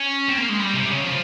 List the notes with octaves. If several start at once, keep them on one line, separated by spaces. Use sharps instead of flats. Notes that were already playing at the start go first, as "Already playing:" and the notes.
Already playing: C#4
C4
A#3
G#3
G3
C3
C#3
F3